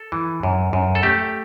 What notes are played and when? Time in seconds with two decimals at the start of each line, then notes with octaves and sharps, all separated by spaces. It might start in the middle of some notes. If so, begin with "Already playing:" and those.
Already playing: A4
0.12 E3
0.43 F#2
0.73 F#2
0.95 A4
1.03 A3 G4